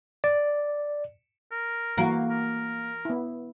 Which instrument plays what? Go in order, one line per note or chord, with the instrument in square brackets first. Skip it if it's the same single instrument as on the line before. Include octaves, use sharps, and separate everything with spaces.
[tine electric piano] D5
[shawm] A#4
[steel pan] E3 F#4 [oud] A#3
[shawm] A#4
[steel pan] B3 E4